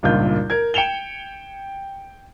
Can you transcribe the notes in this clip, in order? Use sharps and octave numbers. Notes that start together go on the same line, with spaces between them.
G#1 C#2 G2 A#2 F4 G6
A#4 G#6
G5 C#7 E7 F7 G7